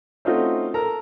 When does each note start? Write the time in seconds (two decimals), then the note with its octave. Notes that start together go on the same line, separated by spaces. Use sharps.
0.25 A3 C4 C#4 D#4 F4 F#4
0.74 A4 A#4 A#5